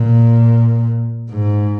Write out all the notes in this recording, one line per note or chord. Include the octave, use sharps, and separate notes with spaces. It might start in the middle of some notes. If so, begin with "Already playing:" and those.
Already playing: A#2
G#2